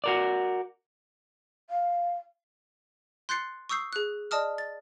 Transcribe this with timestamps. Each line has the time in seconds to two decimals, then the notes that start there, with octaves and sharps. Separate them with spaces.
0.04 F#4 A#4 D5
1.70 F5
3.29 C6 F#6 G6 A6 C7 C#7
3.69 C#6 D#6 E6 G6 C7
3.93 G#4 F#6
4.31 D5 D#5 A5 D#6 F6
4.58 A6